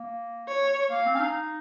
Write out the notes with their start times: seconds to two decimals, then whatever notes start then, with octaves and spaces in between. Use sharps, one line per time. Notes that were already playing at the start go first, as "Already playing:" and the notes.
Already playing: A#3
0.48 C#5
0.91 A#3 F5
1.05 C4
1.15 C#4
1.20 D#4